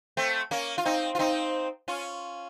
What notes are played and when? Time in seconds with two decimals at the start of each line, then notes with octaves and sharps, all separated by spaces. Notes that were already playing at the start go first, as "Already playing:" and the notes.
0.17 A3 C4
0.51 A#3 C#4
0.78 F4
0.85 C4 D#4
1.15 F4
1.19 C4 D#4
1.88 C#4 F4